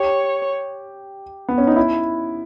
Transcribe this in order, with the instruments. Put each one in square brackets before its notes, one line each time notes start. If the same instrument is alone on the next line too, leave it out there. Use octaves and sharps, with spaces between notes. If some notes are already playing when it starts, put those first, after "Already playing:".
Already playing: [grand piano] G4 [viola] C#5
[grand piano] B3
C#4
D#4
E4